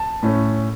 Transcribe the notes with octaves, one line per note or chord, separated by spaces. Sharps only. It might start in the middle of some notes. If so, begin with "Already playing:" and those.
Already playing: A5
A2 A3 C#4